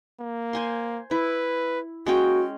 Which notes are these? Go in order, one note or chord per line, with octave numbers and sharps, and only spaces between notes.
A#3
C5 G#5 C6
E4 B4
G#3 A#3 C#4 F#4 G5